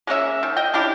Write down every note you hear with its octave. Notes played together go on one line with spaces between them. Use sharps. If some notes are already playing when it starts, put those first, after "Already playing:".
G#3 A#3 C#4 E5
D#3
D#5 G5
C#4 D4 E4 G4